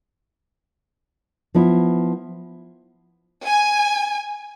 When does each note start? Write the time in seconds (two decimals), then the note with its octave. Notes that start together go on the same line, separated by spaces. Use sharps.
1.54 F3 B3 E4
3.46 G#5